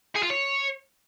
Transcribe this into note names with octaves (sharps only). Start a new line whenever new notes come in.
G#4
F4
C#5